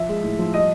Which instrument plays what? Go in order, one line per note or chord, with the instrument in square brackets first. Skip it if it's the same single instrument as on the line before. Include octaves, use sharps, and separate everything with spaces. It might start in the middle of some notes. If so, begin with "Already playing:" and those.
Already playing: [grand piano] F3 E5
G#3
A2
F3
G3 D#5